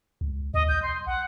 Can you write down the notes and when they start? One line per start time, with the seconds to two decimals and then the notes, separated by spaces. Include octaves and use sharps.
0.21 C#2
0.54 D#2 D#5
0.69 B1 G6
0.83 C6
1.06 F#5